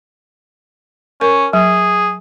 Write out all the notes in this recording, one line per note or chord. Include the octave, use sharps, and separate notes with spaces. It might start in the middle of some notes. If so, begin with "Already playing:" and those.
C#4 A#4
F#3 G#4